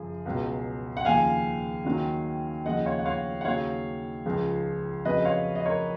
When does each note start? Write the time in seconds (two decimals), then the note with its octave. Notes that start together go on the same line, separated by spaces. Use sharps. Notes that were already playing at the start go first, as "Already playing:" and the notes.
Already playing: F#2 C#3 F3 G#4
0.26 C#2 B2 F#3
0.97 F#5
1.05 D#2 C#3 F3 F5 G#5
1.85 D#2 D#3 F#3
2.65 D#2 C#3 F3 D#5 F#5
2.86 C#5 F5
2.99 F#5
3.05 C#5 F5
3.41 F#5
3.45 D#2 C#3 F#3 C#5 F5
4.25 C#2 C#3 F3
5.05 F2 C#3 F#3 B4 D#5
5.19 D#5
5.25 C#5 F5
5.55 D#5
5.65 A#4 C#5